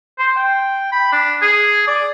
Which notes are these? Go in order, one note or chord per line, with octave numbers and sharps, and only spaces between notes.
C5
G5
B5
D4
G#4
D5